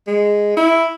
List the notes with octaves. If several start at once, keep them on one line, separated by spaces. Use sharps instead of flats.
G#3
E4